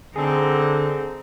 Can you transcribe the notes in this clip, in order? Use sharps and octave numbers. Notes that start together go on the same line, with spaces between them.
D3 C4 D#4 G#4 A4